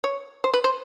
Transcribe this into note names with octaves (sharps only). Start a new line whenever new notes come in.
C#5
C5
B4
C5